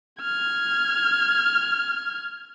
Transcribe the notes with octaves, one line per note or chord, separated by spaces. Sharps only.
F6 G#6